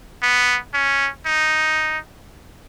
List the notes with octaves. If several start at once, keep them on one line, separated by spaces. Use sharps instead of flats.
B3
C#4
D#4